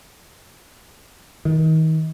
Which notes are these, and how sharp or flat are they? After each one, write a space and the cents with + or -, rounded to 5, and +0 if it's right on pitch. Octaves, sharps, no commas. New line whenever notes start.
D#3 +35